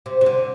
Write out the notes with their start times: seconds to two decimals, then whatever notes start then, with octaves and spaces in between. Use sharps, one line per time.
0.06 C3
0.21 C3
0.26 D3